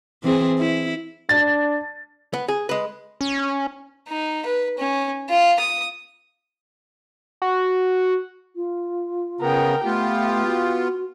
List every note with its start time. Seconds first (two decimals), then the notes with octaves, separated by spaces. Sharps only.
0.23 E3 C4 G#4
0.58 E4
1.29 D4 A6
2.33 B3
2.48 G#4
2.69 G#3 B4
3.21 C#4
4.09 D#4
4.46 B4
4.78 C#4
5.30 F4
5.60 D#6
7.42 F#4
8.56 F4
9.41 C#3 B3 A#4 G5
9.84 A3 B3 F4 G4
10.47 F#4